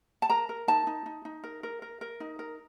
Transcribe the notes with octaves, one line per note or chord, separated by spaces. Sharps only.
A5
A#4 A#5
A#4
D#4 A5
D#4
D#4
D#4
A#4
A#4
A#4
A#4
D#4
A#4